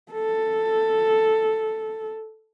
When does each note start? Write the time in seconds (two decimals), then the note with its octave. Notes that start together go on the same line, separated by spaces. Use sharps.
0.12 A4